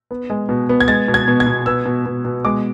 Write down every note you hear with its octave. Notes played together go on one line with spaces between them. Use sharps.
B3
G#3
B2
B3
G#6
G#3 A6
B2
G#6
B2
G#6
B2
B3 E6
B2
B2
B2
G#3 D6